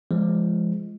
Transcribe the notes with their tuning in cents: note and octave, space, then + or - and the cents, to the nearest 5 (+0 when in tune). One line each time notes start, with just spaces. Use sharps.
F3 -30 G#3 +0